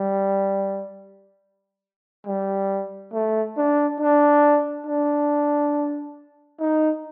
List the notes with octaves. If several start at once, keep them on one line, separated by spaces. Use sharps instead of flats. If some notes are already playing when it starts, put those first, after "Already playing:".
Already playing: G3
G3
A3
D4
D4
D4
D#4